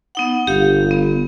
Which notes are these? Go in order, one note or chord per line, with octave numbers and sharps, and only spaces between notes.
B3 D#4 F#5
G1 G4 F5
B3